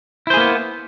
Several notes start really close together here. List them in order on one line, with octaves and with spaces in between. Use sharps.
E4 C5 G#4 A#3 B3